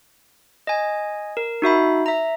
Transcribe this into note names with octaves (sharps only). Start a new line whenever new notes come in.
D#5 G#5
A#4
D#4 F#4 E5 B5
E5 A#5